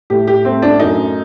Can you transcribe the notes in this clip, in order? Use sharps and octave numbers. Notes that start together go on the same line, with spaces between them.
A2 G4
G4
A3 C4
D4
F#2 D#4